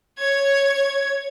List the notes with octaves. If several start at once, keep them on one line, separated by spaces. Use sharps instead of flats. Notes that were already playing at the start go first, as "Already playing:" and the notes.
C#5 G#6